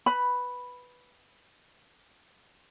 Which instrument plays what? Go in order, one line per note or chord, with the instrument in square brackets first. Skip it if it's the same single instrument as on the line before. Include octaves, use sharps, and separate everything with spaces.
[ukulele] B4 B5